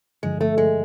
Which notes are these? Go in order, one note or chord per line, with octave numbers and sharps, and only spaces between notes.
G2 D3 F3 G#3
A3
G#3